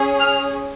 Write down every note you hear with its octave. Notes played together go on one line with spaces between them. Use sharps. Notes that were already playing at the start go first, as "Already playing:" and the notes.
Already playing: C#4 G#4
F6